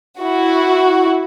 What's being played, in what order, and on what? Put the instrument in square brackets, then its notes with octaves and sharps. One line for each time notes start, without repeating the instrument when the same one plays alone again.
[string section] E4 F#4